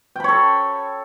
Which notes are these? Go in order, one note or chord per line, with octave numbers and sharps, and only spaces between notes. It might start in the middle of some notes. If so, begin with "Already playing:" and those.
A4 C#5 G5 B5